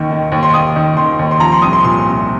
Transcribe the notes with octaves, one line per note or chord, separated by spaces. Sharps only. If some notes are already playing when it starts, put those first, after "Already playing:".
Already playing: D#2 D#3
D#3
D#2
C6
D#2 D#6
D#3
D#3 C6
D#2
C6
F3 A#5
C6
C2 D#6
C6
A#2 C6
C2